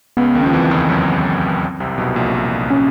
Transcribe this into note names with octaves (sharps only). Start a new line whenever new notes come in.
C#2 C#3 B3
D#2 D#3
F3 C#4
E2 E3 C4
F2 F3
F#2 F#3
C2 C3
B1 B2
A#1 A#2
D4
C#4
C#4